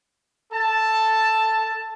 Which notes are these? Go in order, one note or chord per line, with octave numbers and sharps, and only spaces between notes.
A4 A5